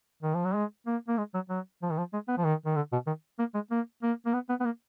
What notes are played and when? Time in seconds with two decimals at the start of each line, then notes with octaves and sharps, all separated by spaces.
0.23 D#3
0.34 F3
0.45 F#3
0.55 G#3
0.87 A#3
1.08 A#3
1.18 G#3
1.34 F#3
1.50 F#3
1.82 F3
1.90 D#3
1.98 F3
2.13 G#3
2.28 B3
2.38 F3
2.44 D#3
2.66 D#3
2.76 D3
2.92 B2
3.07 D#3
3.39 A#3
3.55 G#3
3.71 A#3
4.03 A#3
4.26 A#3
4.34 B3
4.49 B3
4.60 B3
4.65 A#3